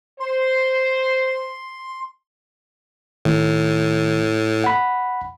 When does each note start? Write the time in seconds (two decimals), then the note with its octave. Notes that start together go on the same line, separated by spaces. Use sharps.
0.20 C5 C6
3.25 A2 D#3
4.64 F#5 B5